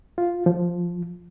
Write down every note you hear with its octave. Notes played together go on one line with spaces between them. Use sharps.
F4
F3